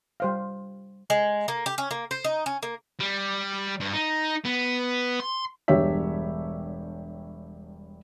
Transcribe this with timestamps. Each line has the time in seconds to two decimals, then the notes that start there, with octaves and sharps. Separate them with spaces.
0.20 G3 C5 F5
1.10 G#3
1.48 A#3
1.66 G4
1.78 C#4
1.91 A#3
2.11 C5
2.24 D#4
2.46 C#4
2.63 A#3
3.00 G3
3.80 G2
3.93 D#4
4.45 B3
5.20 C6
5.68 E1 G2 G4 C#5 E5 B6